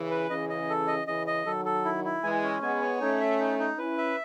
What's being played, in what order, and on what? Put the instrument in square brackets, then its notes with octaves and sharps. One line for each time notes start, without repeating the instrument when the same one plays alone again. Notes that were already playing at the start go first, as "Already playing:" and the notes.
Already playing: [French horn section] C#3 E3
[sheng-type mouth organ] B4
[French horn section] C#3 E3 [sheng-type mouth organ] D#5
[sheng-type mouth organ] D#5
A4
D#5
[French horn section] C#3 E3 [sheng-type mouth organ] D#5
[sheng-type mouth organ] D#5
[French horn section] D#3 F#3 [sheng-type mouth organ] A4
[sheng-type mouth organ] A4
E4
E4
[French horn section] E3 G#3 [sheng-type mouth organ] G#5
[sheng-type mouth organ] C#4
[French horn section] G#3 B3 [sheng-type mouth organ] G#5
[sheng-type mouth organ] C#5
[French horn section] A3 C#4 [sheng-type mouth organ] D#4
[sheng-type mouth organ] E5
D#4
D#4
[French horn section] C#4 E4 [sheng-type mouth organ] B4
[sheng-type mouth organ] E5